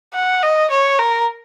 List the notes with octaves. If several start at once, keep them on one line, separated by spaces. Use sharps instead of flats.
F#5
D#5
C#5
A#4